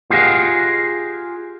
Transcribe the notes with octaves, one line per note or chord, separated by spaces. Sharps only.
F4 G4 G#4 D#5 F5 F#5